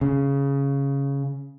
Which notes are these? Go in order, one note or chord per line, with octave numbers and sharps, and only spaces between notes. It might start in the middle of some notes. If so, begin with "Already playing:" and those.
C#3